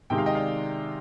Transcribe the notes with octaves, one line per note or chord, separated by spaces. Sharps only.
C3 D#3 G#3 G5
F5
D#5 G5
D5 F5